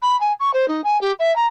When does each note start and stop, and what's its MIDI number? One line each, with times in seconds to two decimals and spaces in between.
0.02 0.18 83
0.20 0.33 80
0.40 0.51 85
0.54 0.66 72
0.68 0.81 63
0.84 1.00 80
1.01 1.12 67
1.19 1.35 76
1.36 1.46 82